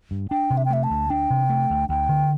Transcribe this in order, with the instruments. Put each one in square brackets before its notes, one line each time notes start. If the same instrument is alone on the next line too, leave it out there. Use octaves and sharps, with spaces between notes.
[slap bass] G2
[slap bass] D4 [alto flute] G5
[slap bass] C3
[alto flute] E5
G5
[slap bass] A3 [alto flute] E5
[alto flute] A5
[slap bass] D2
[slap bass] D4 [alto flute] G5
[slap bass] C3
A3
D2
[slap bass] D2 [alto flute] G5
[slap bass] D3